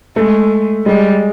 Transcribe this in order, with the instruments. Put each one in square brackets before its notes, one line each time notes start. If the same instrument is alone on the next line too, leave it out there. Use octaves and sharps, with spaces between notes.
[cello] G#3 [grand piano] A3
[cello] G3 [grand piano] G#3